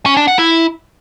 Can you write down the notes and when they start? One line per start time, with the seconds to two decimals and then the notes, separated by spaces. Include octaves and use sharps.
0.06 C#4
0.17 D4
0.28 F#5
0.39 E4